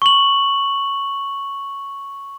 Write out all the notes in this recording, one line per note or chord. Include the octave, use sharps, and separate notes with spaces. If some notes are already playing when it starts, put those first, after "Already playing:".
C#6 F#7